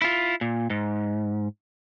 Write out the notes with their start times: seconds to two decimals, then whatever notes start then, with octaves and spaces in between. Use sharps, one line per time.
0.02 E4 F4
0.41 A#2
0.70 G#2